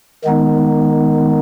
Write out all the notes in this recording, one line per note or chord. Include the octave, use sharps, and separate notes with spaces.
D#3 G#3 B3 D#4